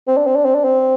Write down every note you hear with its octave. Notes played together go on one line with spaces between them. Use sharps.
C4
D4
C4
D4
C4
D4
C4